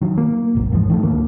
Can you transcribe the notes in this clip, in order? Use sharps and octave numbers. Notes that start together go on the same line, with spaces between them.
D#3 F#3
A#3
D1 G#1
A1 G#2 F3
D#3 F3 A3
D2 A#3